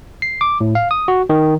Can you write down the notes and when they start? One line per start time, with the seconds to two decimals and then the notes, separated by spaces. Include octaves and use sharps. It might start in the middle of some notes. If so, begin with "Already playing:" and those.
0.22 C7
0.41 D6
0.61 A2
0.75 F5
0.91 D#6
1.08 F#4
1.30 D#3